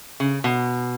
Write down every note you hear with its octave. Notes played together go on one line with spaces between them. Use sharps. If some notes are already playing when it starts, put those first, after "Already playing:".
C#3
B2